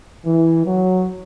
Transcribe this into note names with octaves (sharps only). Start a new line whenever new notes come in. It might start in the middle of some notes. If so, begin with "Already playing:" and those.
E3
F#3